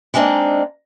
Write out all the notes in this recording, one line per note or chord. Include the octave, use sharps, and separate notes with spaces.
G3 G#3 A#3 C4 D4 D#4